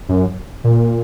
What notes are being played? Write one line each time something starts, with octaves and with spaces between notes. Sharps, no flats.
F#2
A#2